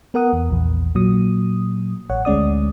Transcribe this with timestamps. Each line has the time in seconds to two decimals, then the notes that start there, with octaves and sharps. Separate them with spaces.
0.14 B3 A#4 F#5 D#6
0.33 E2
0.50 A#1 E2
0.95 A#2 F#3 D#6
2.10 A1 C#5 F#5
2.25 D2 G#3 C#4 D5 D#6